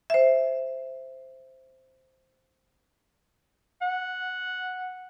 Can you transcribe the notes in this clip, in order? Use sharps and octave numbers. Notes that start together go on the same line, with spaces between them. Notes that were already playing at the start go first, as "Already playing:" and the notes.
C5 E5
F#5